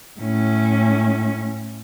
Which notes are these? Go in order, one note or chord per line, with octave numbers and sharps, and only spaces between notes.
A2 C#4